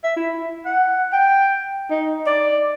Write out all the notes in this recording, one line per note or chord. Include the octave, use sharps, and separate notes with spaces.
E5
E4
F#5
G5
D#4
D5